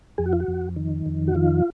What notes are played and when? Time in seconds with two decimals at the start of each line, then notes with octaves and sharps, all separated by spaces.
0.18 F2 G#4
0.26 F#4
0.33 F4
0.40 F#4
0.48 F2
0.76 D#3
1.06 F2
1.28 F#4
1.35 D#3 F4